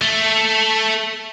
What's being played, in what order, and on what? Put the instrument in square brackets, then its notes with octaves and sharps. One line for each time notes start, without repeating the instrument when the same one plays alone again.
[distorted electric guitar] A3